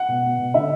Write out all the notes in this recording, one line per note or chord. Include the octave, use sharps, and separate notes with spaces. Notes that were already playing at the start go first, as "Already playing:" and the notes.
Already playing: F#5
B2
B2
B2
D3 E5